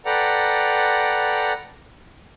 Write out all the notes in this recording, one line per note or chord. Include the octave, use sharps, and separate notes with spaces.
A4 B4 D5 F#5 G5 A#5